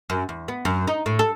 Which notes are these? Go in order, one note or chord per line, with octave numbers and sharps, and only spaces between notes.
F#2
E2
B3
F#2
D#4
A2
A4